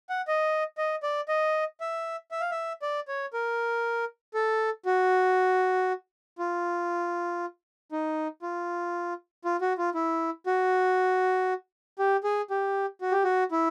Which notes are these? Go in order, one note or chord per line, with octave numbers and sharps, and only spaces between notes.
F#5
D#5
D#5
D5
D#5
E5
E5
F5
E5
D5
C#5
A#4
A4
F#4
F4
D#4
F4
F4
F#4
F4
E4
F#4
G4
G#4
G4
F#4
G4
F#4
E4